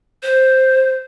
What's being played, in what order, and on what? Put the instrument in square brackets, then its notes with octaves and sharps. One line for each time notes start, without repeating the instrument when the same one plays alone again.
[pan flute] C5